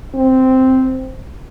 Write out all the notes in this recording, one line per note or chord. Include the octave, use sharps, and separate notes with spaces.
C4